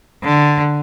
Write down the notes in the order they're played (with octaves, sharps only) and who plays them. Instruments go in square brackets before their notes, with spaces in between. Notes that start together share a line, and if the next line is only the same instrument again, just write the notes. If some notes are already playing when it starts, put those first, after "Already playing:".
[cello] D3